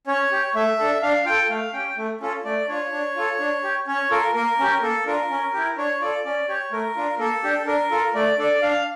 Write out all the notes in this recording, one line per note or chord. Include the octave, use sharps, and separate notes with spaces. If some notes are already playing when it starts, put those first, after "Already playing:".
C#4 C#5
G4
A3 E5
D4 A4
D4 F5
F4 A4 G5
A3 F5
C#4 G4 G5
A3
C#4 F4 A4
A3 D5
D4 F4 C#5
D4
F4 A4
D4
G4
C#4 C#5
F4 A4 A#4
A#3 A#4
C#4 G4
A#3 A4
D4 F4 A#4
C#4
E4 G4
D4 C#5
F4 A4 D5
C#4 D5
G4 C#5
A3 A#4
D4 F4
A#3 A4
D4 G4
D4 A#4
F4 A4
A3 D5
D4 A4 D5
D4 F5